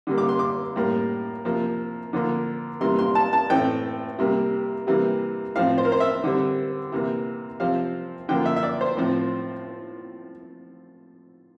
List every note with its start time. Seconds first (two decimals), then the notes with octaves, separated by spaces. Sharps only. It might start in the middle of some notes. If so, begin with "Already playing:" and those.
0.07 D3 G3 A#3
0.18 D6
0.29 C6
0.39 D6
0.76 A2 G3 A#3
1.45 C3 F3 A#3
2.13 D3 F3 A#3
2.81 C3 E3 G3 A#3 C6
2.99 C6
3.15 A5
3.33 A5
3.50 A2 E3 A3 C4 G5
4.19 C3 G3 A#3
4.87 C3 E3 G3 A#3
5.56 A2 F3 C4 F5
5.78 C5
5.85 A#4
5.92 C5
6.00 E5
6.24 D3 G3 C4
6.92 C3 E3 A#3
7.60 C3 F3 C4 F5
8.29 D3 F3 A#3 G5
8.46 E5
8.56 E5
8.63 D5
8.81 C5
8.97 A2 F3 C4